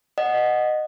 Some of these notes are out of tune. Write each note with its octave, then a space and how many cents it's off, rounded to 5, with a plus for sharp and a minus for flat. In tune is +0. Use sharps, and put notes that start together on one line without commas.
D#5 -15 F#5 +0